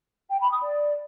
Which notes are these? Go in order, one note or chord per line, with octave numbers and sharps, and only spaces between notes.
G5
B5
D#6
D5